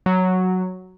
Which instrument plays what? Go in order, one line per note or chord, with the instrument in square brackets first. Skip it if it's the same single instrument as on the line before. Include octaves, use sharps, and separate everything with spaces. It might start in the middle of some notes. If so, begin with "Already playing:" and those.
[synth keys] F#3